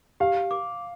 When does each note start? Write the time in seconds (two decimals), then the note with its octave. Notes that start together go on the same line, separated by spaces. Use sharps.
0.20 G4 F5
0.51 D6